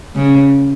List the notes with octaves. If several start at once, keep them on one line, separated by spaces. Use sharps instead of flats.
C#3